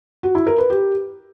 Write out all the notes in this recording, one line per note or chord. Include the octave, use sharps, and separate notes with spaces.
F#4
E4
A#4
B4
G4